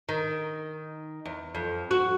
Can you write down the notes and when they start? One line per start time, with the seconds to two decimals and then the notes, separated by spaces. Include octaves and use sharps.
0.09 D#3
1.25 E2
1.55 F2
1.91 F#4